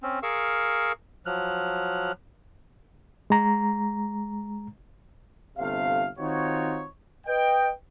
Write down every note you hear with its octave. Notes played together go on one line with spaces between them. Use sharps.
C4 C#4
G#4 A#4 F5 C#6 E6
F3 F#3 F6 F#6
G#3 A#5
G1 C3 A3 F5
D#3 C4 D#4 F4 F#4 C#5
B4 D#5 G5